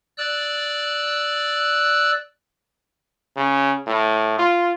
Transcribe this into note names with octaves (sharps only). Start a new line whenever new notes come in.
D5 E6 F#6
C#3
A2
F4